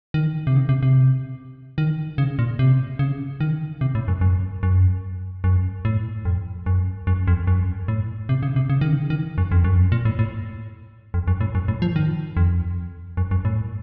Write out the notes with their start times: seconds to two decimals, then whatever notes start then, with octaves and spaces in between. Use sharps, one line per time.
0.14 D#3
0.47 C3
0.56 C#3
0.69 C3
0.83 C3
1.78 D#3
2.18 C#3
2.39 A#2
2.59 C3
2.99 C#3
3.41 D#3
3.81 C3
3.95 A2
4.08 F#2
4.21 F#2
4.63 F#2
5.44 F#2
5.85 A2
6.25 F2
6.66 F#2
7.07 F#2
7.28 F2
7.47 F#2
7.88 A2
8.29 C3
8.43 C#3
8.56 C3
8.70 C#3
8.81 D#3
8.92 C#3
9.10 D#3
9.38 F#2
9.52 F2
9.64 F#2
9.77 F2
9.92 A#2
10.05 A2
10.19 A2
11.14 F2
11.28 F#2
11.41 A2
11.55 F#2
11.68 A2
11.82 F3
11.96 D#3
12.37 F2
13.17 F#2
13.31 F#2
13.45 A2